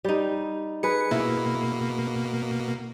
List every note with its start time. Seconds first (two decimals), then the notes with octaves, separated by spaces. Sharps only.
0.04 G3 D#4
0.83 G#4 B4 C#7
1.11 B2 A#3 E4